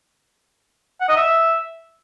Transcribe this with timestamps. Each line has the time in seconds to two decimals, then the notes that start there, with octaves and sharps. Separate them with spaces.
1.01 F#5
1.09 D#5
1.17 E5